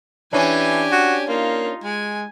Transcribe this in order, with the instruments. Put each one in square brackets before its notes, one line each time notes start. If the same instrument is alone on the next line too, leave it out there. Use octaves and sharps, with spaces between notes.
[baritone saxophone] E3 [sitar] C#4 D4 [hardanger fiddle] G4 G#5
[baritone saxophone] F#4
[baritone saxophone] A#3 [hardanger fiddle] D#4 F4
[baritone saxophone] G#3 [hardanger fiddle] G#5